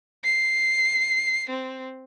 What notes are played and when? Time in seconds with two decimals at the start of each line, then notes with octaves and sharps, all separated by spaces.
0.24 C7
1.50 C4